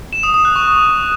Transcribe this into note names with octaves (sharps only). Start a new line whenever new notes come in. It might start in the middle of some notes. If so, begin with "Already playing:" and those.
E7
D#6
D#6
F#6
C#6